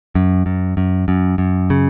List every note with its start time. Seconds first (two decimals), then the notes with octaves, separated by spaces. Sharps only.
0.15 F#2
0.46 F#2
0.77 F#2
1.08 F#2
1.38 F#2
1.70 C#3